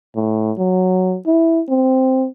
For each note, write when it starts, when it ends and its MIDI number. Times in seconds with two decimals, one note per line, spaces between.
0.16 0.52 45
0.58 1.17 54
1.26 1.62 64
1.69 2.27 60